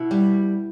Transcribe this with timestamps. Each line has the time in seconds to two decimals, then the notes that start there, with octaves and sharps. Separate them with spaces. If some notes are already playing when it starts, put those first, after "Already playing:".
Already playing: B2 E4
0.11 G3